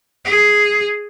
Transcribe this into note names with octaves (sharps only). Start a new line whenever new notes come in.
G#4